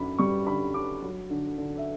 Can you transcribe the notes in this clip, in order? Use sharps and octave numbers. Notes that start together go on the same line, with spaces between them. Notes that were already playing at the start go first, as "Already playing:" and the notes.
Already playing: F#2 D3 D4 B5
G3 C#6
D3 B5
D4 D6
F#3
D3
D3
E5